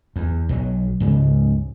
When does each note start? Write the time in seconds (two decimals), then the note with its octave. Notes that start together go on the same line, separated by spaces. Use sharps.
0.16 E2
0.49 B1 F3 F#3
1.00 C#2 G#2 C#3